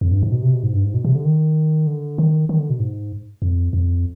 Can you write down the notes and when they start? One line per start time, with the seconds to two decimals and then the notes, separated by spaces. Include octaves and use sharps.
0.01 F2
0.11 G2
0.23 G#2
0.32 B2
0.43 C3
0.53 B2
0.63 G#2
0.73 G2
0.84 G#2
0.94 B2
1.04 C3
1.15 D3
1.25 D#3
1.87 D3
2.18 D#3
2.49 D#3
2.59 D3
2.70 B2
2.80 G#2
3.42 F2
3.73 F2